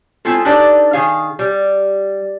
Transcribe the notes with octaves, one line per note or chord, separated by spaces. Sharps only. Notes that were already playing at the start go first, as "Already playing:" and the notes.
G#3 C4 E4 F4 A4
D4 D#4 G4 A4 B4 D5
D#3 G#4 F5
G3